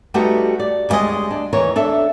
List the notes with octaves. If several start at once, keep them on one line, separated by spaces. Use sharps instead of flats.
G3 A3 B3 D#4 F#4 G4
D5
D2 C#3 G3 G#3 D#5
D4
D#2 E3 A#4 C#5
D4 A4 E5